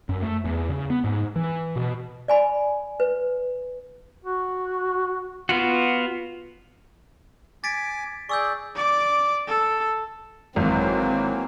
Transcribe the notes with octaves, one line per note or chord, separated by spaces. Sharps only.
F#2
A3
E2
C#3
B3
G#2
E3
B2
D5 G#5 B5
B4
F#4
B3 F4 F#4
G#5 D6 A6 B6 D7
G#4 D5 C#6 E6 G6
D5 D6
A4
G#1 E3 F#3 A#3 C4